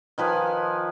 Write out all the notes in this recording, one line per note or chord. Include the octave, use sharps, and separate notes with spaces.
D#3 F3 B4 G#5